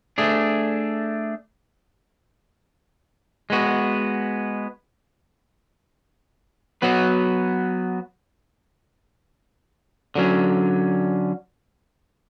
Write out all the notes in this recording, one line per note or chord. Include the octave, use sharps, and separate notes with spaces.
A3 D4 G#4
G#3 B3 F#4
F#3 B3 F#4 B4
D3 F#3 C#4